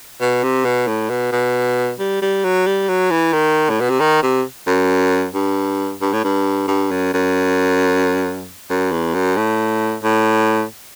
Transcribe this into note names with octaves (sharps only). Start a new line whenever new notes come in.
B2
C3
B2
A2
B2
B2
G3
G3
F#3
G3
F#3
E3
D#3
A2
B2
C3
D#3
C3
F#2
G2
G2
A2
G2
G2
F#2
F#2
F#2
E2
F#2
A2
A2